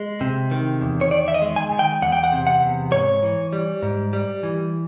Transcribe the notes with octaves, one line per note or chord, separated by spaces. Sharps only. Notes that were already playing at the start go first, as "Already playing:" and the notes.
Already playing: G#3
C3
D#3
E2
C#5
D#3 D5
E5
D#5
G#3
G#5
D#3
G5
E2 F#5
G5
F#5
C3
F#5
E2
G#2 C#5
E3
G3
G#2
G3
E3